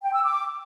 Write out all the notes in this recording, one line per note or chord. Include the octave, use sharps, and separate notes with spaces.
G5
E6
D6